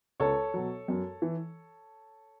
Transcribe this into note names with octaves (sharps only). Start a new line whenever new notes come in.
C#2 A4 C#5
B2 F#3
F#2
E3